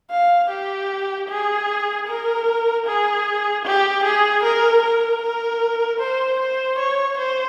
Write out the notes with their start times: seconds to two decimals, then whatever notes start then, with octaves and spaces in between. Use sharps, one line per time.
0.11 F5
0.50 G4
1.29 G#4
2.07 A#4
2.86 G#4
3.65 G4
4.04 G#4
4.43 A#4
4.82 A#4
5.22 A#4
6.00 C5
6.40 C5
6.79 C#5
7.18 C5